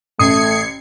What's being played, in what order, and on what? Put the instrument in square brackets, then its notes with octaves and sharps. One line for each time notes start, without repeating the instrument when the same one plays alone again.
[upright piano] A1 [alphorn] A3 [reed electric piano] D#6 [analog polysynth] G#6 C7 C#7